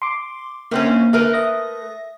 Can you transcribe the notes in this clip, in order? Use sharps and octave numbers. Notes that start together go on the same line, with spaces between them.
C6 D6
F#2 A#3 C4 C#4
A3 A#4 B4
E5 D#6 A#6